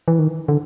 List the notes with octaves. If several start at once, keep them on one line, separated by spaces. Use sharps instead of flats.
E3
D#3
D3